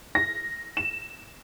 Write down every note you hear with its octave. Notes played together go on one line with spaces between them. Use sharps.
A#6
E7